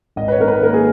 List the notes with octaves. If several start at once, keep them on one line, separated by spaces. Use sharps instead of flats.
G#1 D#5
B4
C#5
D#3 A#4
B4
A#3 A#4
G#4